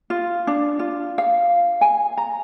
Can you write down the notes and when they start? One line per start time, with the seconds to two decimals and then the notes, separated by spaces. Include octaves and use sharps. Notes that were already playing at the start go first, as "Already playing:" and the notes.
0.10 F4
0.47 D4
0.79 F4
1.18 F5
1.81 G#5
2.17 A#5